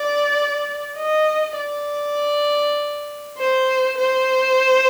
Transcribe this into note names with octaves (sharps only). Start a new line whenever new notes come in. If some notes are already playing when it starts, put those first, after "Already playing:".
Already playing: D5
D#5
D5
C5
C5